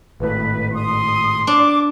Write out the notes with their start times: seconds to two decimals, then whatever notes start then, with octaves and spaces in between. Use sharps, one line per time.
0.20 G#1 A2 B4
0.73 C6 D#6
1.47 D4 D6